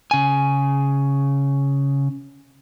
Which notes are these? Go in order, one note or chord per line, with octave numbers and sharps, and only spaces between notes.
C#3 G#5